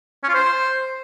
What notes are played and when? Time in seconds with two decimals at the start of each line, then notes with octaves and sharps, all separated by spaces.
0.23 C#4
0.29 F4
0.34 C5